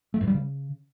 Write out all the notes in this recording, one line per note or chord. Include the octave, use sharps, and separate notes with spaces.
A3
G2
G3
C#3